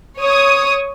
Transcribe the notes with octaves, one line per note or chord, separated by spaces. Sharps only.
C#5 D#6